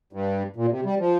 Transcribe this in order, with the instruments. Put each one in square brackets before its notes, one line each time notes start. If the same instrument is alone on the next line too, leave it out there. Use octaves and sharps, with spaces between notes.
[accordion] G2
A#2
C3
G3
F3